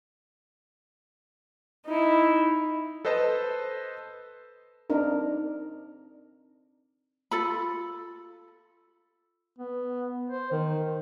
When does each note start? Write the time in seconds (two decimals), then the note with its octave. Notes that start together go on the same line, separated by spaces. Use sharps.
1.87 D#4 E4
3.05 A4 B4 C5 D#5 A5
4.90 C4 D4 D#4 A#4
7.31 F4 A4 B5
9.58 B3
10.30 C5
10.51 D#3